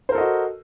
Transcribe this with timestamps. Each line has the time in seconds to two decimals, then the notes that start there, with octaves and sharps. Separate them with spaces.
0.09 C5
0.12 A#4
0.15 A4
0.18 D#5
0.21 F#4